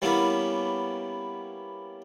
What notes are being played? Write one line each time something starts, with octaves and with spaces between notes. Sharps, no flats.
G3 A#3 B3 C#4 D4 E4